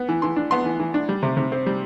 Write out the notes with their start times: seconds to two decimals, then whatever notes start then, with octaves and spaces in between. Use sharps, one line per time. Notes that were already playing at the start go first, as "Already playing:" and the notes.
Already playing: B3
0.09 E3
0.22 E3 C6
0.36 D4
0.51 B3 C6
0.66 E3
0.80 E3
0.94 D4
1.09 G3
1.23 C3
1.37 C3
1.52 C4
1.66 G3